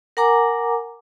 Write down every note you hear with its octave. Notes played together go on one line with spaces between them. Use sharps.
A#4 F#5 G#5 A#5 D6